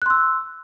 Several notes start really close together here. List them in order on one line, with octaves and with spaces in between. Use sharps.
F#6 C6 E6